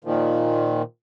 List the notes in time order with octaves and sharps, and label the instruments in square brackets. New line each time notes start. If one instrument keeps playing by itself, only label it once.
[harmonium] A#2 D#3 F3